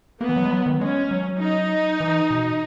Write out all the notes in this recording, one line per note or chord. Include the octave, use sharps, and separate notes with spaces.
A#3 B3
E3
F#3
G#3
F#3
D#3
G#3 C#4
F#3
D#4
E3
B2